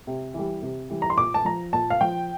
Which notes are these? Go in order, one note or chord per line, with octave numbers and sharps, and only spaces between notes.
C3
E3 G3
C3
E3 G3
A#5
C6
A#2 D6
A5
F3 A#5
A#2 A5
F5
F3 G5